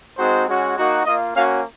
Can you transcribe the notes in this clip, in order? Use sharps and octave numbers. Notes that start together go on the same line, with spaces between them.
G#3 C4 D#4 F#4 C5
G#3 C#4 F#4
A#3 D#4 F#4
A#3 F4 D#5
A#3 C#4 F#4 F5